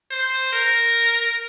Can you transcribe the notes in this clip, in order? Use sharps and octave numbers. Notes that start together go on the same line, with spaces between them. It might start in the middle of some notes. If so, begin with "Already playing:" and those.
C5
A#4